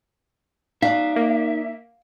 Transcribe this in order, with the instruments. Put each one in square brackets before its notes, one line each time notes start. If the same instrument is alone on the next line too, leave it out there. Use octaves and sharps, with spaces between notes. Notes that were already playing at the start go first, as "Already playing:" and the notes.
[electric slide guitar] D#4 D5 [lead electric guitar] E5 [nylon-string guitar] F5
[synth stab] A#3